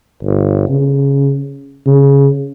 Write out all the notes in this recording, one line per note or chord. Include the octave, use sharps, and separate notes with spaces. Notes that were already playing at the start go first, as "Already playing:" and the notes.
G1
C#3
C#3